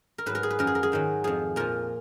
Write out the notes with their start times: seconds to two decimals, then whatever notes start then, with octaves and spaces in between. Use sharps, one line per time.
0.18 A#4
0.26 G#2 F#3 B4
0.35 A#4
0.43 G#4
0.50 B4
0.59 F#2 F3 A#4
0.67 G#4
0.75 A#4
0.83 G#4
0.92 G#2 D#3 F#3
1.24 F2 F3 G#4
1.56 A#2 F3 A#4